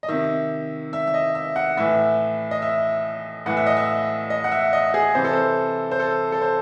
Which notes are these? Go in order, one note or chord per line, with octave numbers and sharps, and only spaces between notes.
D#5
C3 D#3 E5
E5
E5
D#5
E5
F#5
A2 E3 E5
D#5
E5
A2 E3 F#5
E5
D#5
E5
D#5
F#5
E5
D#5
G#4
C3 E3 C5
A4
C5
C5
A4
A4
C5